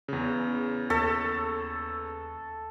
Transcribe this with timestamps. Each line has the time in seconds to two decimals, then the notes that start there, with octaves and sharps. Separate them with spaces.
0.08 E2 C#3
0.90 D#2 A4 C#6 B6